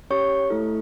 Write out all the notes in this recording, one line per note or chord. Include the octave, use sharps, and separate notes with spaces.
C#4 G4 C#5 C#6
A3 E4 A4